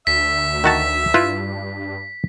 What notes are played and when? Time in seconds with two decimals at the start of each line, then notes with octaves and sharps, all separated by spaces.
0.07 D2 E5 B6
0.64 D#3 F#4 A5
1.14 G2 E4 F4 B4